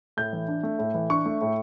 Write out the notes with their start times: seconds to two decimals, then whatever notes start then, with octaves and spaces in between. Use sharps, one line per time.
0.17 A2 G6
0.33 E3
0.48 D4
0.63 A3
0.79 A2
0.94 E3
1.10 D4 C#6
1.26 A3
1.42 A2